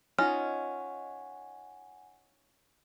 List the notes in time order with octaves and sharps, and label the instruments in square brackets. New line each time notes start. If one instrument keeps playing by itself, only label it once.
[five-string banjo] C#4 [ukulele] D#4 F4 D#5 [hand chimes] F#5 G#5 [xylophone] F6